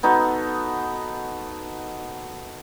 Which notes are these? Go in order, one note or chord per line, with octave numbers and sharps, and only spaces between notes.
B3 D#4 F#4 A4